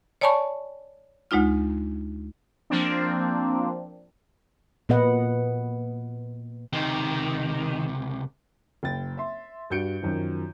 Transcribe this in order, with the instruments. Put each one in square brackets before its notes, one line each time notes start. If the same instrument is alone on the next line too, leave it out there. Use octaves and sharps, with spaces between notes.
[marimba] C#5 D5 G#5 A5 B5 C#6
D2 G#3 D#4 F4 F6
[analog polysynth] F3 A#3 C4 D4
[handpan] A#2 B3 B4 D#5 F#5
[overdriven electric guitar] C#2 C3 [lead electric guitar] D#3
[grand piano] F#1 G5 A6
E5 C6
G2 F#4 G6 C#7 D7
F#2 D#3 F3